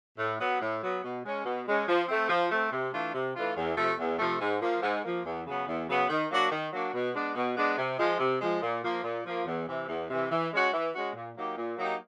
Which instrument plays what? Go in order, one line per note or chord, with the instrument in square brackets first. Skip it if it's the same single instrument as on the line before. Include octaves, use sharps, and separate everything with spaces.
[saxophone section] A2
F#3 B3
A2
F#3 B3
B2
G#3 C#4
B2
G#3 C#4
F3
A3 C4
F3
A3 C4
C3
E3 A3 D4 F4
C3
E3 A3 D4 F4
E2
C3 F3 A3
E2
C3 F3 A3
G#2
F3 A#3
G#2
F3 A#3
E2
C#3 F#3 B3
E2
C#3 F#3 B3
D#3
F#3 A#3 D4 F#4
D#3
F#3 A#3 D4 F#4
B2
G#3 B3 D4
B2
G#3 B3 D4
C3
F3 G#3
C3
F3 G#3
A#2
F3 A#3
A#2
F3 A#3
E2
C3 E3
E2
C3 E3
E3
G#3 C#4 F#4
E3
G#3 C#4 F#4
A#2
F#3 A#3 D#4 G4
A#2
F#3 A#3 D#4 G4